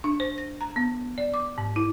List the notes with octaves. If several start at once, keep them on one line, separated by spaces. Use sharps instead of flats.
D4
C5
A#6
A#5
B3
D5
D6
G#2
E4